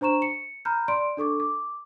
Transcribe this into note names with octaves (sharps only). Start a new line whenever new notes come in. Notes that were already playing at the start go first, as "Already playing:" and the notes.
D4 C5 A#5 C#6 E7
C#7
A#5 B5 F6 G6
D5 C6 D7
D4 A4 C#6 D6
D6